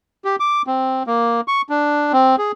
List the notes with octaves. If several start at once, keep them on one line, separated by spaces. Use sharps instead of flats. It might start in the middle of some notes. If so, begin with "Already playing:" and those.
G4
D6
C4
A#3
C#6
D4
C4
G#4